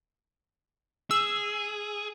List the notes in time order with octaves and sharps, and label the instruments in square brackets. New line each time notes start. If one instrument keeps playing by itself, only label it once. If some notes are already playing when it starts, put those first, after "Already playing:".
[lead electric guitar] G#4 [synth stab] E6